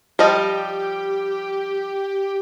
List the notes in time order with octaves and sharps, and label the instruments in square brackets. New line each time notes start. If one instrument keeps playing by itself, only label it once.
[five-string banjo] F3 G3 D#5 [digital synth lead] G4